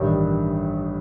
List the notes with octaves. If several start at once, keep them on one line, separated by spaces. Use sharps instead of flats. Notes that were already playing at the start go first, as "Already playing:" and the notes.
Already playing: A1 G2 D#3 G3 D4